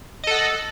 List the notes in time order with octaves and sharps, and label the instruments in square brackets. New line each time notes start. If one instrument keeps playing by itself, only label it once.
[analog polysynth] D#5
A4
F#5